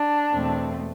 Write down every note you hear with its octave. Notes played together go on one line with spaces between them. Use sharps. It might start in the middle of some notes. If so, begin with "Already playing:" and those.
Already playing: D4
E2 B2 A3 C4